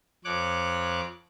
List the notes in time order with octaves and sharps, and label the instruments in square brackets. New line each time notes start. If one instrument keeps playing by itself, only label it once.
[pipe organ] F2 C#5 D6 F#6